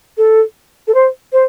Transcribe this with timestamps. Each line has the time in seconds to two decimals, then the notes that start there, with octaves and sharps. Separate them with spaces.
0.17 A4
0.87 A4
0.94 C5
1.32 C5